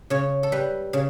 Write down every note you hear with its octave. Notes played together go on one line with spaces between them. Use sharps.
C#3 C#5
A4
G3 B4
C#3